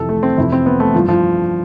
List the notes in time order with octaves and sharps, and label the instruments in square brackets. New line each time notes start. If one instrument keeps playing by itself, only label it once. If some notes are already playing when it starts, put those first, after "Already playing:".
Already playing: [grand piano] F2 C3 E3 A4
A3
C4
F2 C3 E3 E4
C4
B3
A3
G2 E3 F3
F3